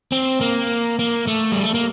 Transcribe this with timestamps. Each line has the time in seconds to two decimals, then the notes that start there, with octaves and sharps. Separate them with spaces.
0.12 C4
0.41 A#3
0.99 A#3
1.27 A3
1.52 G3
1.63 A3
1.74 A#3